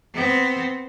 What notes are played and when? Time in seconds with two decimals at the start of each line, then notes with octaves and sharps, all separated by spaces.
0.14 B3 C4